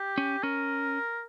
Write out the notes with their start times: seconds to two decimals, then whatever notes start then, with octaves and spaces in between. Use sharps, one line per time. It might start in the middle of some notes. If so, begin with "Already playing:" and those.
Already playing: G4
0.18 C#4
0.43 C#4 A#4